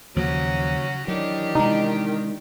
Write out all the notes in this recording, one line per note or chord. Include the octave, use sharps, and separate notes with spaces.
D#2 C#3 F3 F#3 C#4 F#4
D#3 E3 F#3 D4 G4
C3 G#3 D#4